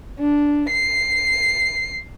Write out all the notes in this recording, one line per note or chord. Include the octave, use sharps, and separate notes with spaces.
D4
C7